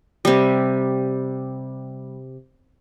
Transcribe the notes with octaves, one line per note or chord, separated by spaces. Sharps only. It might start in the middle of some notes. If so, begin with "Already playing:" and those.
C3 G3